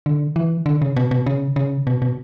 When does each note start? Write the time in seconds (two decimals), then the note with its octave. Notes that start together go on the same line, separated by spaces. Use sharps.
0.06 D3
0.36 E3
0.66 D3
0.82 C#3
0.96 B2
1.11 B2
1.27 C#3
1.56 C#3
1.87 B2
2.02 B2